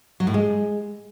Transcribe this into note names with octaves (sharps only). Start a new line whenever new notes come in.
F#3
A2
G#3